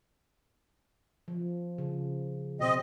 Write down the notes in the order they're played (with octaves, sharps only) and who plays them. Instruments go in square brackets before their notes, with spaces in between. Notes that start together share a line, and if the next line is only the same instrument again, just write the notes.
[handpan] F3
C#3
[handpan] B2 [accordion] C4 D#5